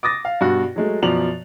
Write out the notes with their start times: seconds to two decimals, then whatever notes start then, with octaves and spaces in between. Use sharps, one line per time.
0.03 D6 D#6 A6 A#6
0.25 F5
0.41 G2 B2 F#4
0.76 F#3 G#3 A3
1.02 F#2 B2 F3 D5 F7 F#7